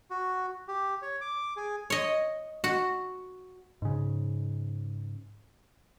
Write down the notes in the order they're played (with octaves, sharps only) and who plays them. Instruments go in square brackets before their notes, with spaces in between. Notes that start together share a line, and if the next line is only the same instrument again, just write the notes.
[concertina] F#4
G4
C#5
D6
G#4
[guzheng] C#5 D#5
F#4
[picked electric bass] G#2 C#3